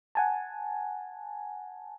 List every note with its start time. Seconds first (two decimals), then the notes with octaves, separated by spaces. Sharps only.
0.15 F#5 G#5 A5